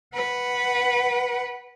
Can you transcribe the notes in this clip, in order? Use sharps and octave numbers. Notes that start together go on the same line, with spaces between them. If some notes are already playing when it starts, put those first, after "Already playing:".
B4 F#5